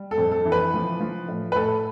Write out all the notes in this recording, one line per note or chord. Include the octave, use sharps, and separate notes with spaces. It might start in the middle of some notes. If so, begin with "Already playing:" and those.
Already playing: G3
A4
F2
A4
E3
B4
F3
F3
A2
B4
A2 A4